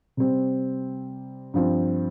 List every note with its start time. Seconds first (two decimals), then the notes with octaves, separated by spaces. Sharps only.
0.17 C3 G3 C4
1.54 G2 F3 C4